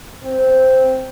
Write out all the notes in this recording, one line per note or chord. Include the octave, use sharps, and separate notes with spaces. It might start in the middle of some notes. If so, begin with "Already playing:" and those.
C4